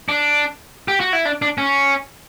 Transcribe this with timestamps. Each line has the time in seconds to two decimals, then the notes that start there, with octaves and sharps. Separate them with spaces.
0.09 D4
0.88 G4
1.00 F#4
1.13 E4
1.25 D4
1.42 D4
1.58 C#4